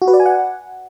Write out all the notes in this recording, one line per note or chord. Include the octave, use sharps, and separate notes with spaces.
F#4
B4
D5
G#5
F#5